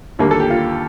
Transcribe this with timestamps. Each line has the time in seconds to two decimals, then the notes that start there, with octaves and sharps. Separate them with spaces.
0.19 D#2 D3 G3 A#3
0.31 A4
0.40 G4
0.50 F4